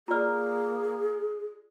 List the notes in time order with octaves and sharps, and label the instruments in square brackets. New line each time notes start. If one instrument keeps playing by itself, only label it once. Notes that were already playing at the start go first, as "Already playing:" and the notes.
[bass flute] A#3 [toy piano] F4 D5 [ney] G#4 [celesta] A#5 F6